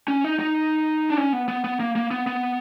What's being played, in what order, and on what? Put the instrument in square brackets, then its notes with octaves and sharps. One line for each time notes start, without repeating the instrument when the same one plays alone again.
[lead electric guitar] C#4
D#4
D#4
D4
C#4
B3
B3
B3
A#3
A#3
B3
B3